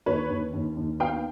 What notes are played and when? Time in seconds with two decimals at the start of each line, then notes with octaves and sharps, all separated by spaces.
0.06 D#2 B4 C#5
0.30 D#2
0.54 D#2
0.77 D#2
1.00 B3 F5 G5